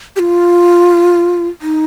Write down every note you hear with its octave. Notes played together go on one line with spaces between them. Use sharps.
G4
F4
D#4